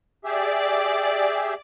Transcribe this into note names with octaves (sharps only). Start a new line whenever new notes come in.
G4 G#4 D5 E5